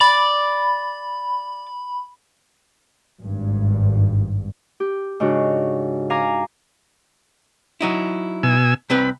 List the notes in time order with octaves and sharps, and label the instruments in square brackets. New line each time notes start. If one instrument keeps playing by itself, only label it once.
[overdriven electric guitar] D5 [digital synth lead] B5
[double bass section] G#1 G2
[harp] G4
G#2 C#3 D4 F#4
F5 G#5 A#5 D6
[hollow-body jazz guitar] F#3 D#4 E4
[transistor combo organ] B2 G#5 E6
[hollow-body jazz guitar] C2 C4 B4 [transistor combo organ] B5